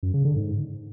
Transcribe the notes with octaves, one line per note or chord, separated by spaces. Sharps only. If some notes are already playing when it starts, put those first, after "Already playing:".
F#2
C#3
D3
G#2